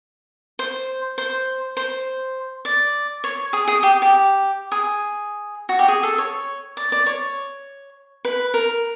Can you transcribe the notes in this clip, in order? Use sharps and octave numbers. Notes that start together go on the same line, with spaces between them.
C5
C5
C5
D5
C#5
G#4
G#4
G4
G4
G#4
F#4
G4
G#4
A4
C#5
D5
D5
C#5
B4
A#4